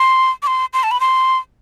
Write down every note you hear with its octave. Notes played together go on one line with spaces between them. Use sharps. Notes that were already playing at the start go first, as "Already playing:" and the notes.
Already playing: C6
D6
C6
C6
A5
B5
C6